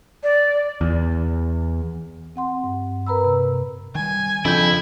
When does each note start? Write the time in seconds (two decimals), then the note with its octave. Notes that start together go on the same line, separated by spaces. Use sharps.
0.23 D5
0.81 E2
2.36 C4 F#5 C6
2.64 G2
3.07 A#4 B4 A#5 B5 E6
3.25 C3
3.95 D#3 G3 G#5
4.45 F2 C#3 D4 E4 G6